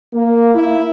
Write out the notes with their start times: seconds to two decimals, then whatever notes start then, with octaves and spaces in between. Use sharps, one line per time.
0.13 A#3
0.54 E4